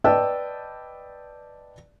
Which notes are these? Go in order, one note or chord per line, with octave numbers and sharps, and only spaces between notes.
B4 D5 D#5 G5 A5 E6